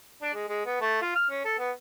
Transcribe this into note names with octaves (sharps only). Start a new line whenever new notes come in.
D4
G#3
G#3
B3
A3
F4
F6
C#4
A4
B3